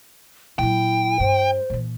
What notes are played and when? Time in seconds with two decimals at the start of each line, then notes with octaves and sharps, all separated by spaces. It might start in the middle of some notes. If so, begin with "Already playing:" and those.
0.59 A#2 F#3 E4 G5
1.20 G2 C5
1.70 A#2 E3